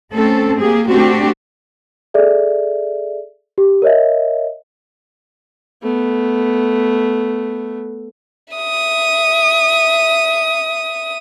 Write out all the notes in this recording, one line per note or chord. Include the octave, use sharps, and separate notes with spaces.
A3 C4 C#4 A4
A#3 G4 G#4
A3 C4 D4 F#4 G4
G#4 A4 D5 E5
G4
A#4 C#5 D#5 E5
A3 B3
E5 D#6